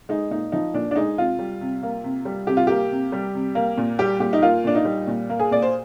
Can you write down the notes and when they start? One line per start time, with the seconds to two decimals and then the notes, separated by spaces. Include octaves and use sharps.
0.09 G#3 D#4
0.31 A#2 D#4
0.52 F3 D#4
0.74 A#2 D4
0.91 D4
0.96 G#3 D#4
1.18 C3 F4
1.39 G3
1.61 C3
1.83 A#3
2.04 C3
2.25 G3
2.47 C3 G4
2.57 F4
2.67 A#3 G4
2.91 C3
3.12 G3
3.35 C3
3.55 A#3
3.78 A#2
3.99 G3 G4
4.20 A#2 G4
4.33 D#4
4.42 A#3 F4
4.64 A#2 D4
4.75 D#4
4.85 G3
5.07 A#2
5.29 A#3
5.40 G#4
5.51 A#2 D5
5.62 C5